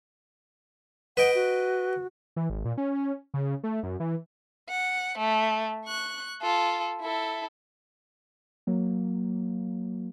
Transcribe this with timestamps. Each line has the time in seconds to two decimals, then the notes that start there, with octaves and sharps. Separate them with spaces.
1.17 B4 D#5 F#5 G5
1.35 F#4
2.36 E3
2.50 G#1
2.65 A#2
2.78 C#4
3.34 C#3
3.64 A3
3.83 F#2
4.00 E3
4.69 F#5
5.19 A3
5.85 C#6 F#6
6.42 F4 A4
7.01 E4 A4
8.67 F#3 A#3